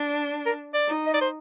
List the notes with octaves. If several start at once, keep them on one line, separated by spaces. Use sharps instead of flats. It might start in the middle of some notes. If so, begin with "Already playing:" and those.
Already playing: D4
A#4
D5
D#4
D#5
D5
C5